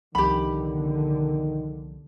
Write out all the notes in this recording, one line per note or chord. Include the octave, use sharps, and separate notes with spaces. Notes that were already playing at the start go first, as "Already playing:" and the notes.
C2 B2 D3 D#3 F3 G4 B5